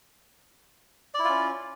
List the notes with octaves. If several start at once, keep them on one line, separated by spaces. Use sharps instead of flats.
C#4 E4 F4 D5